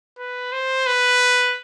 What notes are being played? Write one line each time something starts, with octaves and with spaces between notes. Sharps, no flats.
B4
C5
B4